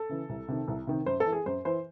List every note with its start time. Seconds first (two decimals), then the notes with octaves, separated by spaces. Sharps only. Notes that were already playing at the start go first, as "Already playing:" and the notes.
Already playing: A4
0.09 C#3 E3
0.29 C2
0.49 C3 D#3
0.68 C2
0.87 C3 D#3
1.06 F#2 C5
1.20 A4
1.26 E3
1.32 G#4
1.46 F#2 C5
1.65 E3 C5